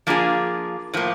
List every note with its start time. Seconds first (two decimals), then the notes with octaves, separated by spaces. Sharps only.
0.07 F3 A#3 D4 F4 G#4
0.94 A2 F3 A#3